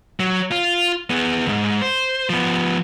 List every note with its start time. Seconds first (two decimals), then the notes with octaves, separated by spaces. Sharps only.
0.20 F#3
0.52 F4
1.10 B3 G#4
1.46 C2 G#2
1.82 C5
2.30 F3 B3